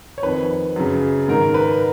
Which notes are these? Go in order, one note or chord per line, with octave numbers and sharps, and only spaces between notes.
C#5
F2 D#3 B4
F#2 C#3
G#2 D#3 A#4
B4